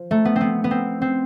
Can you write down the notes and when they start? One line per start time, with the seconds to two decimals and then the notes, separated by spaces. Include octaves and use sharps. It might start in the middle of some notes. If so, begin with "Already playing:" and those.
Already playing: F3
0.11 A3
0.25 B3
0.36 C4
0.41 B3
0.64 B3
0.71 C4
1.02 C4